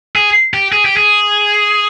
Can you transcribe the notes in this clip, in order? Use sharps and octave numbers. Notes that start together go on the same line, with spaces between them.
G#4
G4
G#4
G4
G#4